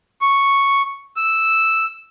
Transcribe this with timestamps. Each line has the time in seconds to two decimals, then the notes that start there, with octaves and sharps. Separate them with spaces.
0.21 C#6
1.16 E6